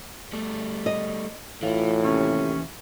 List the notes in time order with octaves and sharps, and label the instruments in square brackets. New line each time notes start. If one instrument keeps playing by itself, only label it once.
[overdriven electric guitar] G3 A3
[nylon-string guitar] D#5
[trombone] A2 [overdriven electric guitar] E3 [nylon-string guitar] F4
[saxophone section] D#2 C3 C#4